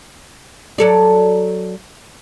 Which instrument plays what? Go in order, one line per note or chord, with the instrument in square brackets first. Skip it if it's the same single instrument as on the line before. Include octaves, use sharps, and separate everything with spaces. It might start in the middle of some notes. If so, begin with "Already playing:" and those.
[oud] F#3 A4 D5